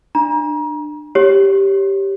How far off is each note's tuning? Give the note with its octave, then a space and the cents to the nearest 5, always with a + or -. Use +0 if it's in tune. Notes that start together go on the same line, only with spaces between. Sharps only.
D4 +30 A#5 +30
G4 +0 C#5 +0